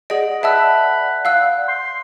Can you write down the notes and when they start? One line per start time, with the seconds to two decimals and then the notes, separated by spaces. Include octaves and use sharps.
0.10 G#4 D5 D#5 F#5
0.43 B4 E5 A5 E6
1.25 F5 E6 F#6
1.68 C6